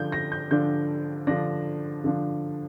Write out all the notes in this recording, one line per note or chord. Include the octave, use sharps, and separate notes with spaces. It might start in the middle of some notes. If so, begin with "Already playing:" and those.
Already playing: D3 F3 D4 G6
A#6
G6
D3 F3 D4 G6
D3 F3 D4 A#6
D3 F3 D4